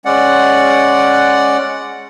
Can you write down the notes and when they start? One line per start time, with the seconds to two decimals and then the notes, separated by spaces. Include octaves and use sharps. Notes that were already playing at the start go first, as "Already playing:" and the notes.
0.05 G#3 C#4 D5 F#5